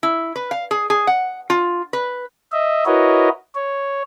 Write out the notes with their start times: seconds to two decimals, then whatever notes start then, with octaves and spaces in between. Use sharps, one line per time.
0.03 E4
0.36 B4
0.51 F5
0.71 G#4
0.90 G#4
1.07 F#5
1.50 F4
1.93 B4
2.52 D#5 E5
2.86 E4 F#4 A#4 B4 C#5 D#5
3.55 C#5